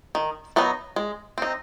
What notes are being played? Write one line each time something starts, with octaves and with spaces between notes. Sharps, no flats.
D#3
F#3 B3 D#4
G#3
C4 D#4